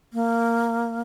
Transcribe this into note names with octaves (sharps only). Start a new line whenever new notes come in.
A#3